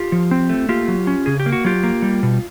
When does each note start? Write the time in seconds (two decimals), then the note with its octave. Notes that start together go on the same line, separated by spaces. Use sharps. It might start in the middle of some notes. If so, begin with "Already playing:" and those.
Already playing: F4 G4
0.12 F3
0.31 C4
0.49 A3
0.69 A#3 F4 G4
0.88 F#3
1.07 C#4
1.26 C#3 G#4
1.40 G4
1.46 A#3
1.52 F#4
1.65 F#3 F4 G4
1.84 A#3
2.02 G3
2.23 B2